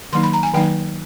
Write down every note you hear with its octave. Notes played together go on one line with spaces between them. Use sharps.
D#3 F#3 A#3 D#4 C6
B5
A#5
G#5
D#3 F#3 A#3 D#4 G5